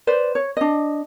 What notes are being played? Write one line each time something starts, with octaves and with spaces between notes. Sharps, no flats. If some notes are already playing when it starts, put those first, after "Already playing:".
B4 C5 D5
C#5
D4 D#5